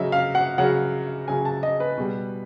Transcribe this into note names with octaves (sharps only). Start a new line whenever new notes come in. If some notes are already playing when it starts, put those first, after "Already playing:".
Already playing: C#3 F#3 D#5 E5
F5
F#5
C#3 F#3 F#5
C#3 F#3 G#5
A5
D#5
B4
B2 G3